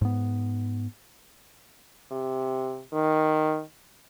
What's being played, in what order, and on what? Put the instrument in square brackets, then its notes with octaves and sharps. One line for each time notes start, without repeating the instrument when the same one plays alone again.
[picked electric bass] G#2 B3
[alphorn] C3
D#3